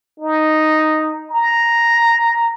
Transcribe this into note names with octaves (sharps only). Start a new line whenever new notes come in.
D#4
A#5